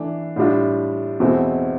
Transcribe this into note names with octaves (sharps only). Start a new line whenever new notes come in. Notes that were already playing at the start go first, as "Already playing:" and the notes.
Already playing: E3 A3 D4
A2 G3 D4 F4
E2 B2 A3 C4